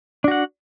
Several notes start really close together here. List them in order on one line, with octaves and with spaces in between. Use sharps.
D4 F#4 F#5